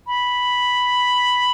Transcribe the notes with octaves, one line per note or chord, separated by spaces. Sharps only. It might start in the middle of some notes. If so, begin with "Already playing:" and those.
B5